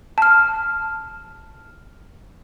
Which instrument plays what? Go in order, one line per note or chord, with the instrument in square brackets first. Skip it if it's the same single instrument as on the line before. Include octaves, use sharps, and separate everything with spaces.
[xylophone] A5 F6